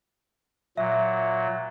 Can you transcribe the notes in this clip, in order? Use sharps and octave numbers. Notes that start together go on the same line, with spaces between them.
A#2 F#3 E5